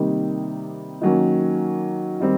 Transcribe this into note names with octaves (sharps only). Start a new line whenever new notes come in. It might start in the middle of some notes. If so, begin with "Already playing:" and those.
Already playing: C3 D#3 G3 A#3 D#4
D#3 F#3 A#3 C#4
D#3 G3 C4